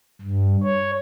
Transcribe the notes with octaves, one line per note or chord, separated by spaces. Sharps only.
G2
C#5